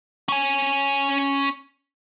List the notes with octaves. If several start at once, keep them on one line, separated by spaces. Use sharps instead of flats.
C#4 G#5